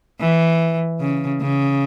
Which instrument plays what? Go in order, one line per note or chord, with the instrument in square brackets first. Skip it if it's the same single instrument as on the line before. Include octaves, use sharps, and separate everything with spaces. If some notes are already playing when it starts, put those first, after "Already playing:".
[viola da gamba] E3
C#3
C#3